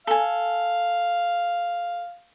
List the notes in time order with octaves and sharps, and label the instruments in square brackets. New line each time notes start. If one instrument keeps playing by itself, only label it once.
[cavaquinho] A4 G#5 [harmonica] F5